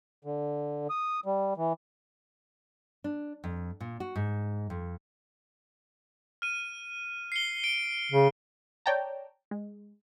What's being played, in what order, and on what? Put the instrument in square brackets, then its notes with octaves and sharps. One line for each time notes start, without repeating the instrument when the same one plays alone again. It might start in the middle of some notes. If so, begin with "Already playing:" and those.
[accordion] D3
D#6
G3
E3
[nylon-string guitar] D4
F2
A#2
F#4
G#2
F2
[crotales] F6 D#7
C7 C#7 G7
D7
[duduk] C#3
[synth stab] C#5 D5 G5 A5 A#5
G#3